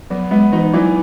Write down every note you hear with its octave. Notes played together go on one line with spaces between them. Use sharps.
F#3 B3
G#3 B3
E3 D#4
E3 F#3